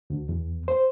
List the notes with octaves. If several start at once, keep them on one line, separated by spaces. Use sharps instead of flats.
D2
E2
C5